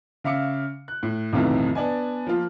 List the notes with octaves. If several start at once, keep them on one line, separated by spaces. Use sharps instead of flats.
C#3 E5 F5 D6 C#7
F#6
A2
B1 F2 A2 C3 D#3 E3
B3 D4 D5 G#5
F3 A#3 F4